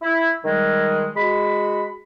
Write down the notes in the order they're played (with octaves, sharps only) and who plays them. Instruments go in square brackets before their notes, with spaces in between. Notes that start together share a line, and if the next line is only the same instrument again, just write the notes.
[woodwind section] E4
D#3 G3 G#3
G#3 F#4 B5